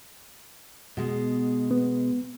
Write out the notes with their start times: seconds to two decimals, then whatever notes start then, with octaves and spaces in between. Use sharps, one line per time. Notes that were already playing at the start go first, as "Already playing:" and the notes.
0.97 B2 G#3
1.71 B3